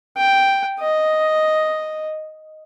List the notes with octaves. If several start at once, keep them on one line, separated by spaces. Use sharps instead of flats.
G5
D#5